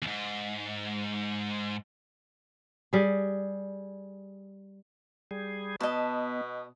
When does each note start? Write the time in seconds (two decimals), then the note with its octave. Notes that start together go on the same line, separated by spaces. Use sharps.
0.02 E2 G#2
2.93 G3 G#4
5.31 G3 G#4
5.80 B2 B3 D#5 A5